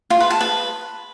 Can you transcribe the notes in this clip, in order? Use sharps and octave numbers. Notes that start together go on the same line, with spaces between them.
F4
B4
A5
B4